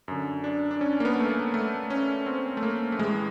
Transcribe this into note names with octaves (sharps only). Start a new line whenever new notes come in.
F#2 D3
D4
D4
C#4
A#3
B3
A3
A#3
A3
C#4
C4
A3
A#3
A3
A2 E3 G#3